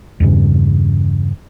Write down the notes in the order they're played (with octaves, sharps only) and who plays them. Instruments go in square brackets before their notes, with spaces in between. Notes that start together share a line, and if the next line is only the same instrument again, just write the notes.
[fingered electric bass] E2 G2 C#3